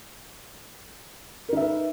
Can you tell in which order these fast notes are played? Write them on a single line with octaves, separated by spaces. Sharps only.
A#4 D#4 E5 B4